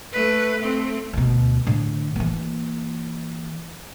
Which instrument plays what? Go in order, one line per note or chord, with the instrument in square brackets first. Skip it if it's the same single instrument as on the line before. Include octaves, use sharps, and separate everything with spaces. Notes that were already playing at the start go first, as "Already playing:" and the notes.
[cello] A3 B4
A3 C4
[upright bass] D2 B2
A2 D3
E3 A#3